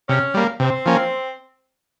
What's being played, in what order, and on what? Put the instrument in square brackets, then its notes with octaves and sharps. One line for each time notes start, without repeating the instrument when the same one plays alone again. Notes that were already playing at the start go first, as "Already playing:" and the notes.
[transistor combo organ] C3 [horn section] C#4
[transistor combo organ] G3 A#3
[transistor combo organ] C3 [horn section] C4
[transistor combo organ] F3 A#3 C#4